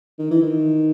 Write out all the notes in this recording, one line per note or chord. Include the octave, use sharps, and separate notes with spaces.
D#3
E3
D#3